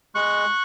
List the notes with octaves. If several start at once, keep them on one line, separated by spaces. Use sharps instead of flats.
G#3 C#6 F#6